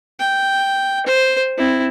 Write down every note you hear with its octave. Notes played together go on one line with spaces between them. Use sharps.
G5
C5
C4 E4